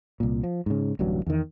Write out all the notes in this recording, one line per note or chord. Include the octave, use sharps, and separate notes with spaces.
C2 A#2
F3
G#2 C#3
D1 A1 G2 F#3
E2 D#3